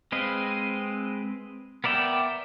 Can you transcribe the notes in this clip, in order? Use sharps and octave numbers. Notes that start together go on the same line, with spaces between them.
G#3 C4 B4 D#5 F5
B3 A#4 D5 E5 G5